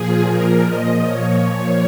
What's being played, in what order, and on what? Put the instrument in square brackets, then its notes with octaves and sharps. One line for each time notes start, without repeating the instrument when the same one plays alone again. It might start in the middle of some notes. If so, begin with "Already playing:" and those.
Already playing: [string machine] A#2 F3 G#4
A#2 F3 A#4
A#2 F3 D#5
A#2 F3 C#5
A#2 F3